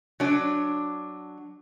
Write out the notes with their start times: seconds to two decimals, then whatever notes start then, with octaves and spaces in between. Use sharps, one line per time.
0.20 F#3 D4